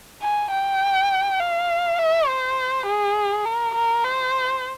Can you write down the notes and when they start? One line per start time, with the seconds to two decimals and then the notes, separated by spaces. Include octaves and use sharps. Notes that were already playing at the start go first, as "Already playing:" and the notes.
0.22 G#5
0.51 G5
1.40 F5
1.99 E5
2.28 C5
2.86 G#4
3.45 A#4
3.75 A#4
4.04 C5